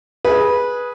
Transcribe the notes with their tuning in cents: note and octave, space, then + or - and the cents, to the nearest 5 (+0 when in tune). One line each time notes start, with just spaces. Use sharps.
G#4 +0 B4 -15